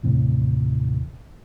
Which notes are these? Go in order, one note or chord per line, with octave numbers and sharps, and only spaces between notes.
D#2 A2 C3 E3